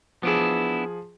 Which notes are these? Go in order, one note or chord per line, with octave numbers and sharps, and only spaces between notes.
F3 B3 D4 E4 G#4